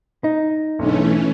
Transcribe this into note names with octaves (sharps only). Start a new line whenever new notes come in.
D#4
B1 G#2 D3 E3 A3 C#4